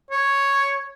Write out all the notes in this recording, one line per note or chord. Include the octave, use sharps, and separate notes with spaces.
C#5